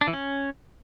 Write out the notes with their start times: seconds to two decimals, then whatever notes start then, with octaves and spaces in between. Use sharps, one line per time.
0.01 D4
0.07 E3
0.13 C#4